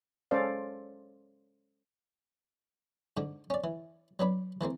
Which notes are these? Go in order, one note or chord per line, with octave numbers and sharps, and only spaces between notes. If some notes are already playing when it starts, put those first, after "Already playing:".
G#3 C#4 A4 C5 D5 F5
G#2 D3 D4
C#4 D5
E3
F#3 B3 D4 B5
E3 A3 A#3 C4